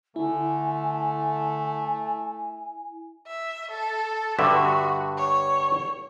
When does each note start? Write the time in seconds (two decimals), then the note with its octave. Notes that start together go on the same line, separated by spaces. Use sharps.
0.16 D3 A3 E4 G#5
3.27 E5
3.71 A4
4.39 G2 D3 F#4 E5
5.18 C#5